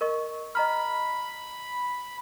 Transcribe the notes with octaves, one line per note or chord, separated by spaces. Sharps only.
A#4 D#5 C#6
D#5 A#5 B5 F6